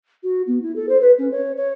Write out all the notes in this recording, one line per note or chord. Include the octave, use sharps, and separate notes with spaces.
F#4
B3
E4
A4
C5
B4
C#4
C#5
C#5